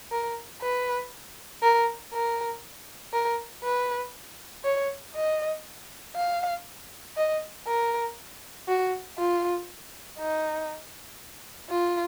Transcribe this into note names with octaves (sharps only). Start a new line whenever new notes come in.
A#4
B4
A#4
A#4
A#4
B4
C#5
D#5
F5
D#5
A#4
F#4
F4
D#4
F4